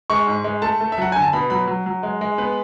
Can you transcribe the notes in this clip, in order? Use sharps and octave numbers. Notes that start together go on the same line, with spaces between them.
G#3 C#6
G#2
G#3
A3 A5
A3
E5
F#3 F#5
D3 G#5
A5
B2 B5
F#3 B5
F#3
F#3
G#3
G#3
B3 B4